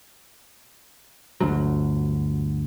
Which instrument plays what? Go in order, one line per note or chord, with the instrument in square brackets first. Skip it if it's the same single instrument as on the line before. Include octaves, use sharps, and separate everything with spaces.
[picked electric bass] G1 D2 F#3